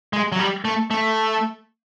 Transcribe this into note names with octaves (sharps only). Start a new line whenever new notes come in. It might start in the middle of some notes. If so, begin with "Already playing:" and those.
G#3
F#3
G3
A3
A3